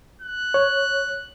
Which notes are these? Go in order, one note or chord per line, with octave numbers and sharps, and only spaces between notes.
F#6
C#5